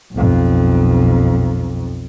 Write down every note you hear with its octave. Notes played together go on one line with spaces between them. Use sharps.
B1 F2